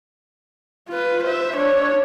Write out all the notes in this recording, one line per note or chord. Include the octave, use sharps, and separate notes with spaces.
F4 B4
C5 E5
D4 C#5